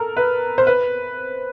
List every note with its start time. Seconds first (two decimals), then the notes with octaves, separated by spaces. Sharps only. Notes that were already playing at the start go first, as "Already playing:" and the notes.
Already playing: A4 A#4
0.17 B4
0.58 C5
0.67 B4